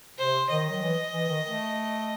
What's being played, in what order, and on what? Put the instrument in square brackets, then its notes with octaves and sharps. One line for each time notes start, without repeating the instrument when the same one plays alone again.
[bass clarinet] C3 [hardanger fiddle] C5
[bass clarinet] D#3 [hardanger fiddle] D#5
[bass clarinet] F#3
E3
E3
D#3
A3